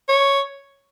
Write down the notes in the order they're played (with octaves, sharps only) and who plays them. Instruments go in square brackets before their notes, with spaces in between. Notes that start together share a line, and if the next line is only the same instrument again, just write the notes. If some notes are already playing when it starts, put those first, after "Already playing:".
[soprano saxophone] C#5